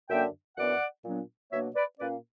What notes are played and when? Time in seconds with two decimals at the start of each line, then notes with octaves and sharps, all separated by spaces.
0.09 F#2 D3 A#3 D4 E5 G5
0.56 F#2 E3 B3 D4 D5 F#5
1.04 A#2 F#3 B3 D4
1.52 B2 F#3 A#3 D4 C#5 E5
1.76 B4 D5
1.99 A#2 A#3 C#4 B4 D5